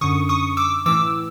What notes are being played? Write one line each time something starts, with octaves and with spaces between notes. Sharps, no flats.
F#2 D3 C#6 D#6
C#6 D#6
D6 E6
A2 E3 D6 E6